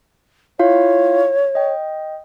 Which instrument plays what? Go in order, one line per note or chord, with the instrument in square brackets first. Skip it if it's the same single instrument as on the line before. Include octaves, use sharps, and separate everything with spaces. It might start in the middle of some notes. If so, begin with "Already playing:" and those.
[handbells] E4 F4 F5 [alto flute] C#5
[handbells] D#5 G5